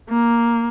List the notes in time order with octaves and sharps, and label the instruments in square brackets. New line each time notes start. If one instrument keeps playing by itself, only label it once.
[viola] A#3